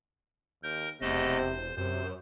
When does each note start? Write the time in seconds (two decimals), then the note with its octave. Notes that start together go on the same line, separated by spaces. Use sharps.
0.63 D#2 A#4 G6
1.01 E1 E2 C3 A3 D#5
1.38 C5
1.77 F#2 C3 C5